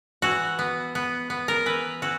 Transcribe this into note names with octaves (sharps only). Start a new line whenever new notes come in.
E3 F#4
B3
B3
B3
A#4
E3 B4
E3 F#4